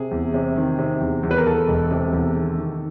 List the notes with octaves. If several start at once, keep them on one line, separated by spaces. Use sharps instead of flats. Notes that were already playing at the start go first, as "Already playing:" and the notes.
Already playing: C3 G#4
E2
C3
D#3
C3
E2
E2
B4
A#4
E2 A4
E1
C3
E2
D#3
D#3